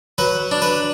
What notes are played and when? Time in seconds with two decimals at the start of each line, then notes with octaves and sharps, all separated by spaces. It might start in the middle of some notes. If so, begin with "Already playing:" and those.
0.18 F#3 B4
0.51 D4
0.62 B4